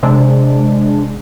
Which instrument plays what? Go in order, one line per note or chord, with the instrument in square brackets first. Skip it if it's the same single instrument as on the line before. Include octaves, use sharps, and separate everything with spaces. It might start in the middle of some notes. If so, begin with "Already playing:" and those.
[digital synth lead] C3 [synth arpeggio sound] G#3 D4